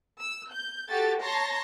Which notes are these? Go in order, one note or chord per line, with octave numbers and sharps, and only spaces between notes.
E6
G6
F#4 G4 A4 A6
C#5 A5 A#5 C6 A#6